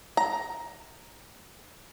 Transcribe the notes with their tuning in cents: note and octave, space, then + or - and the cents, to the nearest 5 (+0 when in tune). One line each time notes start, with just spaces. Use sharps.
A#5 +10